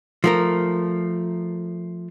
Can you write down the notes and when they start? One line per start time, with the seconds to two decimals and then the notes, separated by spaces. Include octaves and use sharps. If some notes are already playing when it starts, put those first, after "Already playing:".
0.24 F3 A3 A#4